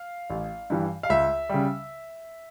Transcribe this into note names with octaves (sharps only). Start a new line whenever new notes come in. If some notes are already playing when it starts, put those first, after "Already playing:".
Already playing: F5
A1
G2 E3 G3
F5
C#2 E5
C#3 G3